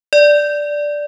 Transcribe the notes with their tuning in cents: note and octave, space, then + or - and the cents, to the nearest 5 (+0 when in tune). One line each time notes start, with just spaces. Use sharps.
D5 +0